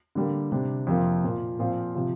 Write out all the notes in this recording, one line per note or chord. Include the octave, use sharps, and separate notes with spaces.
D3 G3 A#3
C3 G3 D4
F2 C3 F3 A#3
A#2 F3 A#3 F4
A#2 F3 C4 F4
C3 F3